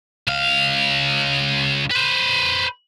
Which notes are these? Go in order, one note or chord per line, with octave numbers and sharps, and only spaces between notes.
C#2 F5
B4 C5